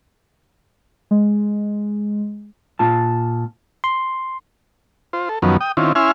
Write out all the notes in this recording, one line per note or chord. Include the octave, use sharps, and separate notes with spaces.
G#3
A#2 F4 A5
C6
F4 C5
A4
F#2 D#3 F3 F#3 B3 C#4
G5 D#6
D#3 C4 C#4 E4 F4
C#4 E4 E5 G#5 C6 F6